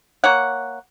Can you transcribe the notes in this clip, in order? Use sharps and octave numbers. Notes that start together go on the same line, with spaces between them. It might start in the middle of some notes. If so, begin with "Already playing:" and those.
A#3 C#5 F#5